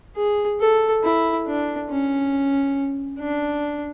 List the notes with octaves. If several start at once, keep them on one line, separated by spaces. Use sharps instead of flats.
G#4
A4
E4
D4
C#4
D4